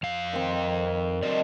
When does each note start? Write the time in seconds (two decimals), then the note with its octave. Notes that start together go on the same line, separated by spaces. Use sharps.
0.03 F2 F5
0.33 D#3 C4
1.23 F#3 C4 A4 D5 D#5